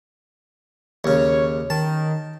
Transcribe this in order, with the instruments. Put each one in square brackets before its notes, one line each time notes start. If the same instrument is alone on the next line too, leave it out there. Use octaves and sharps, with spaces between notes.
[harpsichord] D#2 C#3 [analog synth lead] C#5
[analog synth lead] D#3 [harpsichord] A5